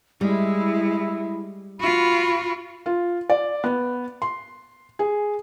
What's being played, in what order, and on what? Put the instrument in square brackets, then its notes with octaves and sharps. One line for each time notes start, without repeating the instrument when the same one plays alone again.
[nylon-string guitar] G3 [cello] G#3 [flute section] E4
[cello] F4 F#4 [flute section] B5
[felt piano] F4
D5
B3
C6
G#4